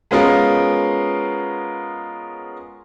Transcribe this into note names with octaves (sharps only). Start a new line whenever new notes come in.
G#3 B3 C#4 F4 A#4